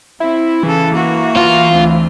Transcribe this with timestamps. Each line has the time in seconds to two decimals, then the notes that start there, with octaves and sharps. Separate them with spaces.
0.20 C4 E4
0.63 C#3 E3 A4
0.93 A#3 F#4
1.37 F4
1.72 D2 C4